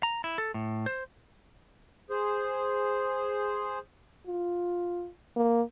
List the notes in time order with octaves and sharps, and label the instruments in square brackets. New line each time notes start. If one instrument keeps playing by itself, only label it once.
[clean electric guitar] A#5
E4
A4
A2
C5
[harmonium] G#4 C5
[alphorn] F4
A#3